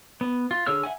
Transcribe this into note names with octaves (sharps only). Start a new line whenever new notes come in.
B3
F4
D3 G#4 C#5 E6 F6
E5 F#5 G#5